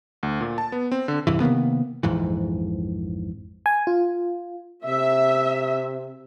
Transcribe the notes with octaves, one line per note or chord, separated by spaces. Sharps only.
D2
A#2
A5
B3
C4
D3
C2 G2 E3
C3 D#3 A#3 B3
A#1 F2 G#2 E3
G#5
F4
C3 E5